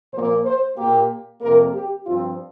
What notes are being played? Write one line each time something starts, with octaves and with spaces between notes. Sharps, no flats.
A#2 F3 A#3 C5
C5
A#2 A#3 G4
F2 C3 A#3 A#4
G4
G2 F3 C4 F4